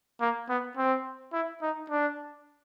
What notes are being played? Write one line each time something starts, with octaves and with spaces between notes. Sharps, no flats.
A#3
B3
C4
E4
D#4
D4